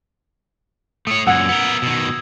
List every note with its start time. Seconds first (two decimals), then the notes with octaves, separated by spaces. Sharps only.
1.07 A3 C#5 D#6
1.27 F#2 A#2 F#5 E6 G#6
1.49 B3 A#4
1.82 B2 D#3